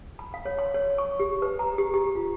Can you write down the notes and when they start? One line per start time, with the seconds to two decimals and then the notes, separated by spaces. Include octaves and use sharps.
0.19 B5
0.34 F5
0.45 C#5
0.59 C6
0.74 C#5
0.98 C#6
1.20 G4
1.42 B4
1.59 A#5
1.78 G4
1.94 G4
2.15 F4